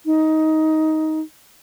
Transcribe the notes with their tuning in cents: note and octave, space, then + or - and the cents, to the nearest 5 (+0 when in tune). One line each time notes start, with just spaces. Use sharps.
D#4 +15